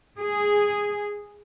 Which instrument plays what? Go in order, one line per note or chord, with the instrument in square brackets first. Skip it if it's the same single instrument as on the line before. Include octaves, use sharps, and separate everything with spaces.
[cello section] G#4